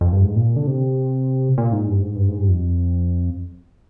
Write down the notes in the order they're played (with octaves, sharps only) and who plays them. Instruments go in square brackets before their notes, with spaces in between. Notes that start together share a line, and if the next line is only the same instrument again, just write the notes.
[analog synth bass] F2
G2
G#2
A#2
D3
C3
A#2
G#2
G2
G#2
G2
G#2
G2
F2